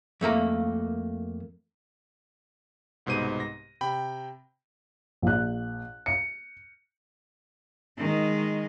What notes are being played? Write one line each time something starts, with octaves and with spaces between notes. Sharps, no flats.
F2 A3 A#3 A#5
C2 G#2 B2 C5 D#7
A#6
C3 G5 B5
A#1 F#6
C#7
D#3 G#3